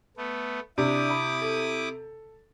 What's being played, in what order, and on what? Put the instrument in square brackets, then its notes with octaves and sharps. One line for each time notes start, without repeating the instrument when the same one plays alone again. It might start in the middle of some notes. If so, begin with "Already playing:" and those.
[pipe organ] A3 B3
[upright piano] C3 [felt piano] D4 [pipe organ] E4 D6 D#6
[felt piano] B5
A4